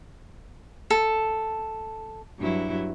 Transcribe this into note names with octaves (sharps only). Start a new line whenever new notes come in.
A4
G2 F#3 E4